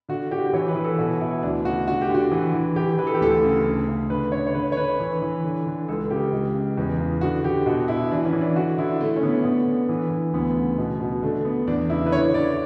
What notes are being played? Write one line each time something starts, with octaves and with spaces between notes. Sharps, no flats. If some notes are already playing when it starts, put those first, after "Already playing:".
D3 F#4
D3 G4
F#4
G4
E3 C#5
B4
E3
A4
B2 F#4
B2 E4
D2 D4
C#3 F#4
D3 F#4
G4
D3
F#4
E3
E3
E3 G4
E3 B4
A4
G4
D2 A4
C#3
D2
C#3
D3 B4
D3 C#5
C#5
D3 B4
C#5
D3 B4
E3
E3
D3
D3
C#2 A4
C#3 G4
C#2
C#3
E2
C#3
D3 F#4
D3 G4
B2 F#4
B2 E4
E3 D4
C#4
E3
D4
D3 F#4
D3 E4
D3 A3
C#4
D3 B3
D3 B3
D3
E3
E3
D2 B3
C#3
B2
B2
D3 A3
D3 B3
E2 D4
C#3 E4
B4
D3 C#5
D3 D5